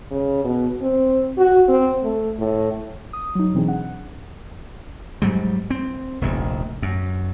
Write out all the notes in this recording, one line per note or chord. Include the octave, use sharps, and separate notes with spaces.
C#3
B2
C4
F#4
C4
A3
A2
D#6
F#3 D#4
B2 E3 C4 D4 D#4 G#4
F#5
G#2 F#3 G3
C4
F1 A#1 D#2
F#2